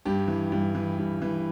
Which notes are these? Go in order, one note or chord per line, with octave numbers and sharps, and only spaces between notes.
G2 G4
E3
G2
E3
G2
E3